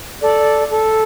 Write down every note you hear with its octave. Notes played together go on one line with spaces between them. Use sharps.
A4 D5
A4